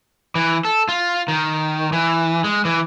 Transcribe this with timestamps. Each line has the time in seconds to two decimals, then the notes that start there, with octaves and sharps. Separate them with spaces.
0.35 E3
0.65 A4
0.88 F4
1.28 D#3
1.93 E3
2.44 G#3
2.65 E3